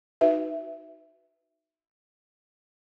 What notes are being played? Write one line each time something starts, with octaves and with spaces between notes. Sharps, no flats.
D#4 F#4 B4 E5